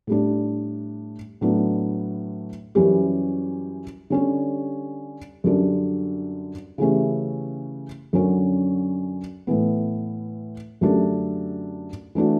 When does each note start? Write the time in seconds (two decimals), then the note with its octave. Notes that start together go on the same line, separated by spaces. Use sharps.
0.07 A2 G3 D4
1.41 A2 F#3 B3 D4
2.75 F#2 E3 G3 C#4 G4
4.10 D3 G3 C#4 G4
5.44 F#2 D3 G3 D4
6.78 C#3 E3 A3 C#4 G4
8.13 F#2 D3 F#3 C#4 F#4
9.47 A2 E3 B3
10.81 F#2 D3 A3 D4 G4
12.15 E3 A3 D4 F#4